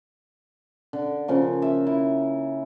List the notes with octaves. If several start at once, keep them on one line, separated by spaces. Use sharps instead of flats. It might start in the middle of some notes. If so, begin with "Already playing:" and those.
D3
C#3 F3 A#3
E5
E4